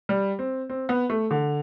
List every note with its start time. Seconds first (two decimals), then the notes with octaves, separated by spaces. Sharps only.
0.09 G3
0.39 C4
0.70 C4
0.89 B3
1.10 A3
1.31 D3